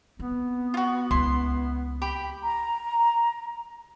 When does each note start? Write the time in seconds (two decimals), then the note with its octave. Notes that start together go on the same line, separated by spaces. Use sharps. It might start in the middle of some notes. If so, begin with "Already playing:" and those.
0.19 B3 C4
0.74 F4 F#4
1.11 C#2 A#3 E4 C6
2.02 G4 G5 B5
2.44 A#5